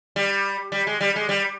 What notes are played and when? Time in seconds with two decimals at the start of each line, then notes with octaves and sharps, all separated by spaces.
0.16 G3
0.72 G3
0.87 G#3
1.01 G3
1.16 G#3
1.29 G3